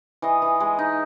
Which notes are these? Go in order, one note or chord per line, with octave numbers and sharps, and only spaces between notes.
E3 D#5
E3
G#3
D#4